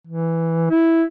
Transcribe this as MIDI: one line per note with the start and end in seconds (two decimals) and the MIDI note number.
0.07 0.69 52
0.70 1.03 64